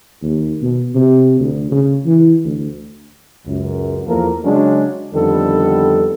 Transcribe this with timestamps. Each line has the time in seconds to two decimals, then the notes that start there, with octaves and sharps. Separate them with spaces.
0.22 D#2
0.61 B2
0.95 C3
1.40 D2
1.71 C#3
2.06 E3
2.44 D2
3.47 C#2 F#2
4.06 E2 F3 A#3 A4 A#4
4.45 C#3 F#3 G#3 C#4 D4
5.14 F2 D3 D#3 G3 B3 A4